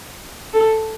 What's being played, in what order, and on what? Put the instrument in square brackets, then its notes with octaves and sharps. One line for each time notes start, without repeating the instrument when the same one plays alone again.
[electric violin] A4